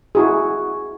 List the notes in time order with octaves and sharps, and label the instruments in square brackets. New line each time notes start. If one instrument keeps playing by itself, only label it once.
[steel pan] E4 F#4 G#4